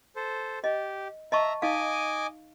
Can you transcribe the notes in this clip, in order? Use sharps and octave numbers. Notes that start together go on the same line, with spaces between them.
A4 C5
G4 D#5
D#5 E5 A5 A#5 C#6
D#4 D#5 F5 G#5 D6